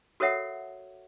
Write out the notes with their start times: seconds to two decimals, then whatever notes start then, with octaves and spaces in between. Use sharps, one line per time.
0.20 F#4 A4 A#4 C#5 E5 F#5